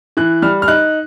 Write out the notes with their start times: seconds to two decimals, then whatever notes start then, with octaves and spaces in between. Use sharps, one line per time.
0.17 E3 F#6
0.42 G3 F6
0.62 F6
0.68 D#4 F#6